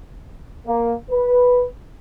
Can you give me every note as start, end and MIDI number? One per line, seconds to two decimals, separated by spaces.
0.67 0.93 58
1.10 1.64 71